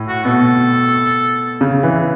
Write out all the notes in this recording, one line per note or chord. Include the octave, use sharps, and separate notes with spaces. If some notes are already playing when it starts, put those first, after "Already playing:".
Already playing: A2
F#4
B2 A4
C#3
E3